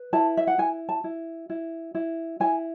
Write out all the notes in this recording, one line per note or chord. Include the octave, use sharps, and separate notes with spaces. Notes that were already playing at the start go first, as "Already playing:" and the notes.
Already playing: B4
E4 A5
E5
F#5
E4 G#5
A5
E4
E4
E4
E4 G#5